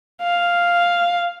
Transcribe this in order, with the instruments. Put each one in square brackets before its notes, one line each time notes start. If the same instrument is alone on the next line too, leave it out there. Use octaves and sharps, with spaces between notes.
[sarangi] F5